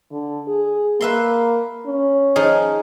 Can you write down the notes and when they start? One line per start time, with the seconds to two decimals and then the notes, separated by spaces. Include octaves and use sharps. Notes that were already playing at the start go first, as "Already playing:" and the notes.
0.11 D3
0.48 G#4
1.01 A#3 B4 E5 C6
1.87 C#4
2.36 F3 D#4 G#4